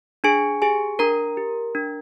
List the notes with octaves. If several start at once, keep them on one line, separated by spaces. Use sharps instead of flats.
D4 G#4 G#5
G4 G#4 G#5
D4 A#4 A#5
G4
D4